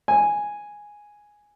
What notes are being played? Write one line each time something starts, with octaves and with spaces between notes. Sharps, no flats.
G#5